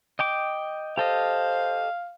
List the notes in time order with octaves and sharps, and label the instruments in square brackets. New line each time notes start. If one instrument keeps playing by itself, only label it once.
[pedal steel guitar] D#5 G5 D6
[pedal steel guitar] G4 A4 D#5 [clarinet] C5 [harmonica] F5